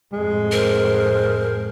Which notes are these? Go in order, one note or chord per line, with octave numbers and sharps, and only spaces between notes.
F2 A2 G#3
A#4 C5